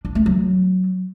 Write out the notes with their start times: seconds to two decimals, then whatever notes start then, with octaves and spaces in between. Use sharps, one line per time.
0.05 D4
0.15 A3
0.26 F#3